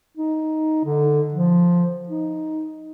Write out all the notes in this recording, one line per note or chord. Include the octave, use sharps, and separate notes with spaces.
D#4
D3
F3
D#4